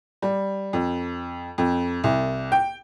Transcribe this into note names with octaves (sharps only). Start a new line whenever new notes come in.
G3
F2
F2
C2
G5